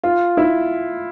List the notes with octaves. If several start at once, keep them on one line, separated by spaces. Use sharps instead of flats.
F4
E4